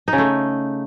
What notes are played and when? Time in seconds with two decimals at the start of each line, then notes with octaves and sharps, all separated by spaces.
0.08 D#4
0.13 C#3
0.18 A3